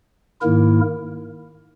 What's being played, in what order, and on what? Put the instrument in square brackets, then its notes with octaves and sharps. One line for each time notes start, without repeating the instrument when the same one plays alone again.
[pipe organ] G#2 D#3 A#3 E4 A#4